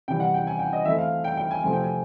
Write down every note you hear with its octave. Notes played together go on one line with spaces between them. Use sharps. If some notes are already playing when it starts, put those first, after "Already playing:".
C3 E3 G3 G5
F#5
G5
G#5
G5
D#5
E3 A3 C4 E5
F5
G5
G5
G#5
C3 F3 A3 C4 G#5
G5
G#5